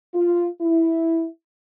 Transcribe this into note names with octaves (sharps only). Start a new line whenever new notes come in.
F4
E4